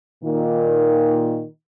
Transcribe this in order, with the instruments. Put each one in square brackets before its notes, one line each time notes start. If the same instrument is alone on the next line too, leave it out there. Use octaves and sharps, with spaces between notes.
[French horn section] A#2 D#3